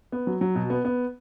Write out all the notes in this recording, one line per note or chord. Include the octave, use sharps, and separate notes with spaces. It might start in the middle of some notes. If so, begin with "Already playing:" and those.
B3
F#3
F#3
B2
B3
B3